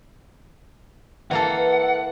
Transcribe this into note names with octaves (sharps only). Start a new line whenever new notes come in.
E3 A#3 A4 F#5
B4